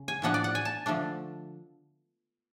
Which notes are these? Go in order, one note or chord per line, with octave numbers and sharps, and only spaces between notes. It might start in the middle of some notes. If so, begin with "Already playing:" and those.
Already playing: C#3
G#5
A2 F3 B3 D4 F#5
D5
F#5
G#5
A5
D3 F3 A3 D4